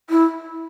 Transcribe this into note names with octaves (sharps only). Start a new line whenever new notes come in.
E4